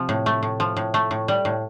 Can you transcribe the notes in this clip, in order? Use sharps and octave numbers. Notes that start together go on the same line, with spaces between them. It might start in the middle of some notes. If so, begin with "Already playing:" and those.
Already playing: C3 F3
A2
A3
A2
F3
A2
A3
A2
G3
A2